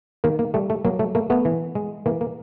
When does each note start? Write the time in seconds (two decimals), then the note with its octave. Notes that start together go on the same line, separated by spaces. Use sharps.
0.24 D#3 A#3
0.39 A#3
0.54 G3 A3
0.70 A3
0.85 F#3 A#3
0.99 A3
1.15 A3 A#3
1.30 A3 B3
1.45 E3
1.75 G#3
2.06 E3 A#3
2.21 A#3